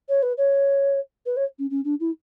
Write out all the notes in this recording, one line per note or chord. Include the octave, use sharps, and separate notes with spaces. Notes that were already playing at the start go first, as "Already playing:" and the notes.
C#5
B4
C#5
B4
C#5
C#4
C#4
D4
E4